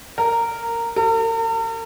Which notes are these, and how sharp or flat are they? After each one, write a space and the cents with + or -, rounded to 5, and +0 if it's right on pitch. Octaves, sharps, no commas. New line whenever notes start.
A#4 -10
A#4 -45